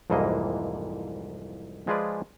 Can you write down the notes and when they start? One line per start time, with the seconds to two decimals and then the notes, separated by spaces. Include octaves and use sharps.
0.10 C2 F2 G#2 E3 A#3 D#5
1.87 F3 G#3 F4 G#4 B4 D5